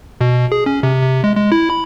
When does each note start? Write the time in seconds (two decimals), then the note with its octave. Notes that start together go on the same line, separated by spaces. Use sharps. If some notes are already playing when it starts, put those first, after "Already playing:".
0.21 B2
0.52 G#4
0.66 C#4
0.83 C3
1.03 C3
1.24 G#3
1.36 G#3
1.52 E4
1.70 B5